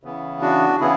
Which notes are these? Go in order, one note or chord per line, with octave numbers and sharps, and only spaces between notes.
C#3 E3 B3
D4 F#4
C#3 E3 B3 E4 G#4